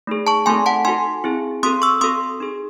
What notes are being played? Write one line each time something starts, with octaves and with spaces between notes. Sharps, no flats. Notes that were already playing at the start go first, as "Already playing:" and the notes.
A3 D#4 G#4
A5 C#6
A3 C4 D#4 F#4 A4 G#5 C6
F#5 A5
D#4 F#4 A4 G#5 C6
C4 E4 G#4
C4 F#4 A4 C6 D#6
C#6 E6
C4 F#4 A4 C6 D#6
D#4 G#4